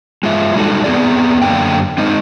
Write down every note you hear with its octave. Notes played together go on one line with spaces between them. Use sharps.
G#3 F4 E5
G3 G#3 D4 D#4 F#4 A4
B3 C4 G#4 D5
F#2 D3 A#3 G5
G#3 C4 D#4 D#5